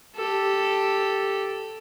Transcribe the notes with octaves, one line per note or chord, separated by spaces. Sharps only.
G4 A4